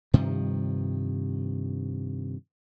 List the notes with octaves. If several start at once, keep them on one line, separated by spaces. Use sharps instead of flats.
G2 C3 D#3 F3